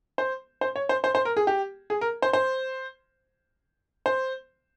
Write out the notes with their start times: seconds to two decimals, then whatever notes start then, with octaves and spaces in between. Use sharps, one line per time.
0.18 C5
0.61 C5
0.76 C#5
0.89 C5
1.04 C5
1.15 C5
1.25 A#4
1.37 G#4
1.47 G4
1.90 G#4
2.01 A#4
2.22 C5
2.33 C5
4.06 C5